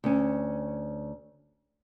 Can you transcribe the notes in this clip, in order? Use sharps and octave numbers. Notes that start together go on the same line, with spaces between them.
D2 C#4